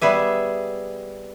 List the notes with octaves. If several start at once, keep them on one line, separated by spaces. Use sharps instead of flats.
G3 B3 G#4 E5